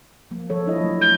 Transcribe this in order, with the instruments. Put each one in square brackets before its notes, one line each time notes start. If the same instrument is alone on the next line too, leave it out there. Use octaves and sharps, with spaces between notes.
[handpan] F3 A#3
F3 A4 C#5
D4 E4 D#5
F#3 A3
[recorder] G6